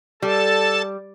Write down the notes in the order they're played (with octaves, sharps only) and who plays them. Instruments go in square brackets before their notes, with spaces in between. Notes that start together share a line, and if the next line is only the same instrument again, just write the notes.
[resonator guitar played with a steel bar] G3 [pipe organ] A4 A5